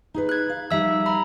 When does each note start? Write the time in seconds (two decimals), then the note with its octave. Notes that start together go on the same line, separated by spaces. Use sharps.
0.14 D#4 G#4 B4
0.29 F#6 G#6
0.49 F5
0.71 F3 G3 D#4 E5 E6
1.06 A#5 B5